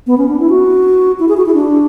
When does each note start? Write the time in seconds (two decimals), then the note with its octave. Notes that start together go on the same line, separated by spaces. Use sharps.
0.07 B3
0.18 C#4
0.28 D4
0.40 E4
0.49 F#4
1.20 E4
1.29 G#4
1.37 F#4
1.46 E4
1.54 D4